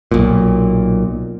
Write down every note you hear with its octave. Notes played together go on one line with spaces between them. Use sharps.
B1 A#2